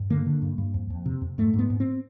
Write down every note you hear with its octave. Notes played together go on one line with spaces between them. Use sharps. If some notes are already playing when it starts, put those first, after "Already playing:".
Already playing: G2
D3 A#3
D3
G2
G2
F2
F2
C3
F2
G#2 A3
G#2
B3
G#2
C4